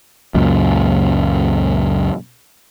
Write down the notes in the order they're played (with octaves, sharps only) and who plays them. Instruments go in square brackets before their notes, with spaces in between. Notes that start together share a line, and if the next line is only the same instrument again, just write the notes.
[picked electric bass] C#2 F#2 A#2